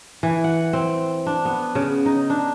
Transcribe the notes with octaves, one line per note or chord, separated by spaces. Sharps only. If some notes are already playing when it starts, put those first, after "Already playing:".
E3
F#5
C4
D4
B3
C#3
D#4
D4